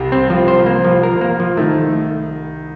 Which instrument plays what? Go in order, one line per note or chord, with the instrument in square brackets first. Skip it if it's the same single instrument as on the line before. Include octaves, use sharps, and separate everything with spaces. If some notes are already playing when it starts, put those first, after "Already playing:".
Already playing: [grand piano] C2 C3
[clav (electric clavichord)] C4
F3
C5
A#3
F3
A#4
A#3
F3
[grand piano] D#3 [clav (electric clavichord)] A3